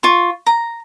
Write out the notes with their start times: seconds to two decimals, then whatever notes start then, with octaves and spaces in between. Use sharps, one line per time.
0.03 F4 C#6
0.46 A#5